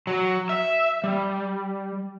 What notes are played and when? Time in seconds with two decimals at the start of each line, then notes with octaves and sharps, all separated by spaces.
0.07 F#3
0.49 E5
1.04 G3